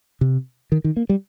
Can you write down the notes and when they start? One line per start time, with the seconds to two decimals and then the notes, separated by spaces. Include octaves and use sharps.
0.21 C3
0.72 D#3
0.84 D#3
0.97 A#3
1.09 G3